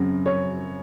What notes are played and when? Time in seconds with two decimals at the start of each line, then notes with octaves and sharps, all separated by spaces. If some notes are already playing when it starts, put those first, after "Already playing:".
Already playing: F#2 C#3 F#3 C4
0.26 C#5